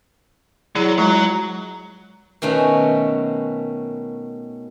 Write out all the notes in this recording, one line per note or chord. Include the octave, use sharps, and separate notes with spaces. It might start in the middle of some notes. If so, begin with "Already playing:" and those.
F#3 E4 G#4 D5
F#3 G#3 F4 F#4 A#5
B2 D#3 A3 C#4